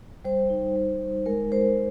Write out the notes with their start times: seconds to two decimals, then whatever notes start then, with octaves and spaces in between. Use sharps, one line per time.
0.25 G3 C5
0.50 D#4
0.76 G3
1.01 D#4
1.26 G#3 A#4
1.52 G#3 C5